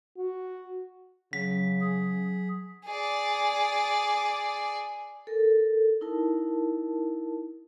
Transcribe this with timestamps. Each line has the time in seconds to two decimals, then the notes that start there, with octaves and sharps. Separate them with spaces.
0.18 F#4
1.33 C#3 F#3 B6
1.81 G#4
2.86 G#4 D5
5.27 A4 A#4
6.01 D#4 E4 A#4 A5